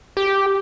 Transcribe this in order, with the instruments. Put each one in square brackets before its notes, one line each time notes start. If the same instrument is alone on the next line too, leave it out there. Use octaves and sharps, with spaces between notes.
[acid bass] G4